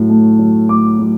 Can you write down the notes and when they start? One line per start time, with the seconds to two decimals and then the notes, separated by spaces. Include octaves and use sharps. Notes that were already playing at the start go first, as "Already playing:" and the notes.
Already playing: A2 F#3
0.09 A3
0.39 F#3
0.69 A3 D6
0.99 F#3